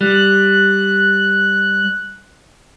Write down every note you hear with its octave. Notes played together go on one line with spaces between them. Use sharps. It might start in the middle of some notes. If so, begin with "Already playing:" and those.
G3 F#6